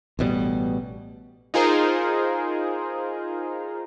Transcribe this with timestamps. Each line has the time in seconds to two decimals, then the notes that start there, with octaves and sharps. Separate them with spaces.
0.19 A1 B2 D#3 G3
1.54 D#4 F4 G#4 A#4 C5